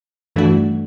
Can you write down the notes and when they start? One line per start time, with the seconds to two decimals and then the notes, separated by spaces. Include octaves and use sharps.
0.36 G2 E3 A3 D4 F#4